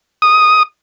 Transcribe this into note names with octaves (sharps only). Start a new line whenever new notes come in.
D#6